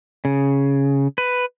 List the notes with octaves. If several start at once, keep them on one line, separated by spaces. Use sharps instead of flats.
C#3
B4